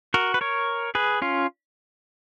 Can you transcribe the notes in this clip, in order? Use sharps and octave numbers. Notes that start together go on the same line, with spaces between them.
F#4 A#4
B4
A#4 C#5
G#4 B4
C#4 F4